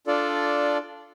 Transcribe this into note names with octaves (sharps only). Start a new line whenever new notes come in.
D4 F4 A4 D5